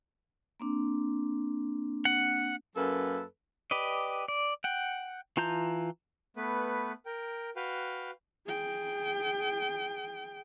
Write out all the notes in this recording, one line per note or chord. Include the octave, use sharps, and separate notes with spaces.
A#3 C4 D4
F#5
F#2 F#3 A#3 A4 B4
G4 B4 D5 D#5
D5
F#5 G5
E3 F4 A5 A#5 G6
A3 B3 B4
A#4 G5
F#4 B4 F5 G5
G#4 G5